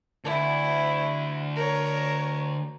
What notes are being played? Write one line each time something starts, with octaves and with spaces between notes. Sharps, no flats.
D2 E4
A#4 C#5